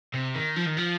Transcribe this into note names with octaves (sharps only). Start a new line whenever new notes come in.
C3
D#3
F3
D#3
F3